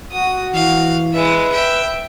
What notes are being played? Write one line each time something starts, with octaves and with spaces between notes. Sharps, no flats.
F#4 D#6
E3 F5
G#3 B4 E5
E5 G5